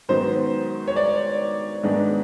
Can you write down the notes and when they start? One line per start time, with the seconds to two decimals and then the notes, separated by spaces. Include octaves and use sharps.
0.09 G#2 D#3 F#3 B3 C5
0.88 C#5
0.96 D5
1.83 G#2 D#3 G#3 B3 D4